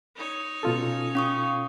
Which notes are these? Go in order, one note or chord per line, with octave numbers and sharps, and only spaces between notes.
D#4 C#5
B2 C#4 F4 A4
C#4 F5 C#6 D#6